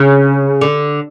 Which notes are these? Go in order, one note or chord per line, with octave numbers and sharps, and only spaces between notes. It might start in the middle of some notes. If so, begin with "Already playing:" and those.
Already playing: C#3
D3